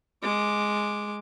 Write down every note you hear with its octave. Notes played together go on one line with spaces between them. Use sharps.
G#3 D6